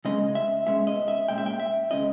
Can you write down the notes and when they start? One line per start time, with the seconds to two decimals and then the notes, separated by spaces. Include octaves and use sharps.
0.05 C#3 G#3 C#4 D#5
0.35 E5
0.66 B2 G#3 C#4 E5
0.87 D#5
1.08 E5
1.28 A#2 G#3 C#4 G5
1.38 E5
1.46 G5
1.60 E5
1.91 C#3 G#3 C#4 D#5